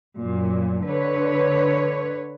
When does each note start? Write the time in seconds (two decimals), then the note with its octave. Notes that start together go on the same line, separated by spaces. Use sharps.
0.19 F#2 A#2
0.85 D3 B4 C#5